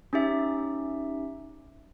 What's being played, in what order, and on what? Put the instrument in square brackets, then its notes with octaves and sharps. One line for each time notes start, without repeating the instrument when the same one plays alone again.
[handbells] C#4 D#4 G4 E5